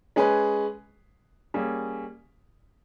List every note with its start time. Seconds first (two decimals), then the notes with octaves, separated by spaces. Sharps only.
0.16 G#3 C#4 G#4 B4
1.54 G3 A#3 C#4 G#4